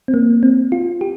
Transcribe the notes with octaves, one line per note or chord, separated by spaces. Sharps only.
C4
A#3
C4
F4
G4